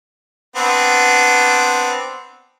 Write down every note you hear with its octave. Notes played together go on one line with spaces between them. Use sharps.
B3 C4 D4